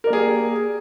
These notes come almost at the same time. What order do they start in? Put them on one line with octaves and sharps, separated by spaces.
A#4 D5 A#3 G#4 G4